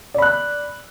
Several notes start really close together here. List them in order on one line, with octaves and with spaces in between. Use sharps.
D5 B5 F#6